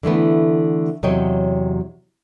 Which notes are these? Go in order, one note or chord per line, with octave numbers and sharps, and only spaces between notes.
D3 E3 A3 B3
E2 C3 F#3 C#5 D#5 G5